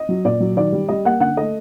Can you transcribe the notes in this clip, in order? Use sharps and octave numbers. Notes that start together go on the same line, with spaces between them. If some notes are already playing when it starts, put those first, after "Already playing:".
Already playing: D#5
F#3
A#2 D5
F#3
D#3 D5
G3
G3 D#5
A#3 F#5
D3 F#5
A3 D#5